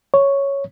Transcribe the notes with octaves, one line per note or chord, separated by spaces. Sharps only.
C#5